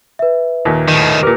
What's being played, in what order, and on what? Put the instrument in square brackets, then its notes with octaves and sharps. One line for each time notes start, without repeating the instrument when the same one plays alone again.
[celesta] B4 E5
[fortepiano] D#2 A#2
[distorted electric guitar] A2 D#3
[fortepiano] A#2 A#4 [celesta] G4 B4 D6